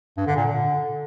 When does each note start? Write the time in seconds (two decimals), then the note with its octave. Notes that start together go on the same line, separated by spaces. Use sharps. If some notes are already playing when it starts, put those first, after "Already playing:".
0.17 G2
0.27 D3
0.36 A#2
0.46 D3